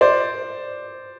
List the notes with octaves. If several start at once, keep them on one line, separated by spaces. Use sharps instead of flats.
C5 D5